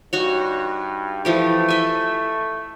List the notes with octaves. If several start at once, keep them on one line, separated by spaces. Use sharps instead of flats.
G2 D#4 F#4 C#5
E3 F3 A3 G4
D#5 E5 G#5